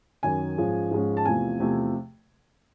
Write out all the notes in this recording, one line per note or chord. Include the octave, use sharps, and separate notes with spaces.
F#2 D#3 F#3 G#5
G#2 F3 G#3 C#4
G#2 F3 G#3 C#4
A5
E2 C3 F3 A3 G#5
E2 C3 F3 A3